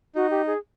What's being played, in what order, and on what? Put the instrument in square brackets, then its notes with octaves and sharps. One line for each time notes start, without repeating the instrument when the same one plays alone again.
[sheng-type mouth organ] D#4 [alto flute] F#4
[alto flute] G4
G#4